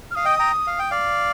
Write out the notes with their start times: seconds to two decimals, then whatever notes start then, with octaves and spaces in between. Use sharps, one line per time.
0.11 F6
0.15 F5 D#6
0.25 D#5 G5
0.39 G5 A#5
0.67 F5
0.79 G5
0.91 D5 F5